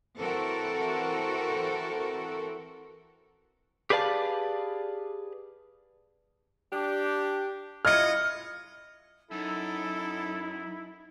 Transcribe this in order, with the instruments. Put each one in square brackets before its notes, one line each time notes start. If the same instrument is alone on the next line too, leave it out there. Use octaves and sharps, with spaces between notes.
[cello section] E3 C4 F#4 A4 A#4
[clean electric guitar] G4 G#4 B4 D5 F5 A5
[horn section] D4 G4
[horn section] E4 F4 D#5 [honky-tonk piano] F6 G#6 C#7
[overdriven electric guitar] F#2 [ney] D#4 [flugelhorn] E4 [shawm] A4